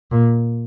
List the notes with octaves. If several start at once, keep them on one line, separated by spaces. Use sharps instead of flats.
A#2